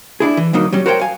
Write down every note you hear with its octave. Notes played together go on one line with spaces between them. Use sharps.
D4 E4 G#4
E3
D2 F#3 A#3 D#4
F#3 G3 C#4
F#4 A#4 C5 C#5 D#5 G5
F5 G#5